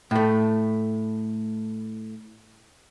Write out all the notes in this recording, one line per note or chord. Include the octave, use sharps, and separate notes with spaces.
A2 A3